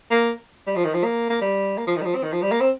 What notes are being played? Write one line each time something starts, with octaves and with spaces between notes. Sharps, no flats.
A#3
G3
F3
D#3
F3
A#3
A#3
G3
A#3
F3
D#3
G3
F3
C4
D#3
F3
G3
A#3
C4